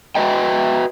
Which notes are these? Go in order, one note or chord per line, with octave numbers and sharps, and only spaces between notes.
F#4 B4 D#5 G5